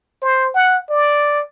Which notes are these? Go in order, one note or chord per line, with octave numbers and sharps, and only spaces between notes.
C5
F#5
D5